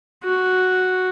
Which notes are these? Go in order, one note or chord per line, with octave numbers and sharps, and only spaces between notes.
F#4